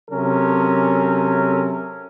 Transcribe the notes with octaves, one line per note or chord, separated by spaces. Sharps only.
C3 F#3 C#4 A4 A#4